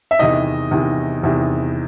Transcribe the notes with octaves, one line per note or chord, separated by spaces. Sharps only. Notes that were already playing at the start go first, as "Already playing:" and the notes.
E5
E2 C3 D#3 D#5
E2 C3 D#3
E2 C3 D#3